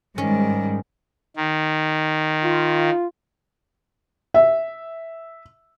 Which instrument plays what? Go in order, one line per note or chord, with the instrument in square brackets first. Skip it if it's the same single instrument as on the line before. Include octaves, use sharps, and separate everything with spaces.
[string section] G#2 [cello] D#3 G3 [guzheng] C#4
[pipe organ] D#3
[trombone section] F4
[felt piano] E5